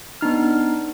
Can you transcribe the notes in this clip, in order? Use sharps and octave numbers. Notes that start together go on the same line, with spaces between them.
B3 D4 D#4 F6